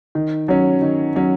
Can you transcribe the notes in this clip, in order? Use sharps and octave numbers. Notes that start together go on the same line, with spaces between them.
D#3
F#3 C#4
D#3
F#3 C#4